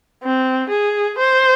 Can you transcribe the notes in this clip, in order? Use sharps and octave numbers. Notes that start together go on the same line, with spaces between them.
C4
G#4
C5